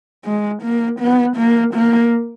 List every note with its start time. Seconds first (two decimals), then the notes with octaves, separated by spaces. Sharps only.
0.25 G#3
0.63 A#3
1.00 B3
1.37 A#3
1.74 A#3